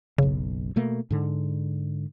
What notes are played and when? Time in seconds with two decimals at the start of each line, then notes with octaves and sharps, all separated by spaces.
0.18 F#1 B1 C#3
0.76 B2 A3 A#3
1.11 G#2 D3